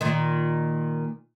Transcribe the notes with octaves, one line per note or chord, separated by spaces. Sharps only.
A#2 D#3